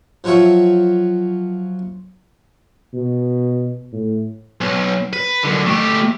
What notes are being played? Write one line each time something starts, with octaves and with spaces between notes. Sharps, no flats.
F3 F#3 F#4 C#5 E5
B2
A2
B1
B4
F#2 D3
A3 G4